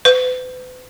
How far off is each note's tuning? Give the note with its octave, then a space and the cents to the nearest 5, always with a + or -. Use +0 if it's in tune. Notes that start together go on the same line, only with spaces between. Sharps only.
B4 +40